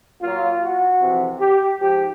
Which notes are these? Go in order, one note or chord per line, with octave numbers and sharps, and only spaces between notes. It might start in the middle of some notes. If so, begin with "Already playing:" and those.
A#2 F#3 F4
F#4
F2 C3 E3
G4
G#2 F3 G4